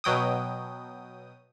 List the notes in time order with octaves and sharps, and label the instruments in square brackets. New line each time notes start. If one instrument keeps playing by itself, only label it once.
[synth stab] B2 F#3 G5 D#6